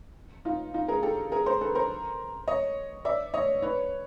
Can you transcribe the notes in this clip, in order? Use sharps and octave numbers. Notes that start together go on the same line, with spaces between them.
D#4 F4
D#4 F4
G#4 A#4
G4 A4
G#4 A#4
A#4 C5
A4 B4
A#4 C5
C#5 D#5
D5 E5
C#5 D#5
B4 C#5